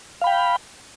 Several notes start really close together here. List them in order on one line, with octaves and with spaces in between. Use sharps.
F5 B5 G5